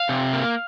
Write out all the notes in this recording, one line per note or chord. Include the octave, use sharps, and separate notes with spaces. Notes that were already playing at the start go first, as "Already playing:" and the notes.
Already playing: F5
C3
A#3